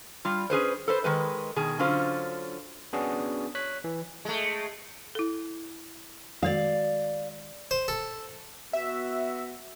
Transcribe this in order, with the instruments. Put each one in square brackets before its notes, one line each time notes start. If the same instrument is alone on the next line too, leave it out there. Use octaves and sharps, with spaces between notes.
[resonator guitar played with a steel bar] G3 F4
C#4 G#4 B4 C5
A4 B4 C5
D#3 G#3 B4
B2 D#3 G#4
D3 F#3 C#4 F4 C5
[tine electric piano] B3 C#4 D4 F#4 G#4
C#5 F#6 B6
E3
[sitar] G#3 A3
[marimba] E4 A4
[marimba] D#3 G#3 F#4 [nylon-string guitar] D5 F5
[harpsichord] C5
A4
[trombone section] B3 F#4 [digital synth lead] E5